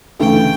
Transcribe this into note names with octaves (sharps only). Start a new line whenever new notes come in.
D2 C#3 E3 A3 G5